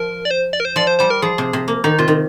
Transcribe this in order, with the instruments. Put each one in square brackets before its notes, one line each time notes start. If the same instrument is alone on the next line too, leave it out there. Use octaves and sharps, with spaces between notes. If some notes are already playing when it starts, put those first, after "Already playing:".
Already playing: [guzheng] F3 [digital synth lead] A#4
[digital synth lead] D5
C5
D5
A#4
C5
[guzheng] F3 [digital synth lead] D5
[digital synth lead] C5
[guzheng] G3 [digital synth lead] C5
[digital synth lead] A#4
[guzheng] F3 [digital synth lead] G#4
[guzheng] C3
C3
A#3
[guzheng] D#3 [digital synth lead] D#4
[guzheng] C3 [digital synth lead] F4
[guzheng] D#3